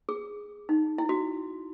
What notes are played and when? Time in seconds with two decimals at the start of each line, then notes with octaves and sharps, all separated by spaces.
0.09 G#4
0.69 D#4
0.98 E4
1.09 F#4